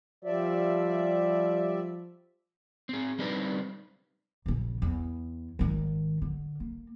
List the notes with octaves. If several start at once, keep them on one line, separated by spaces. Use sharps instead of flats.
F3 G3 D5 E5
C4 G#4
G3 C4 D4 D#4 B4 C5
A#1 C#3
E2
G#1 D#3
D3
A#3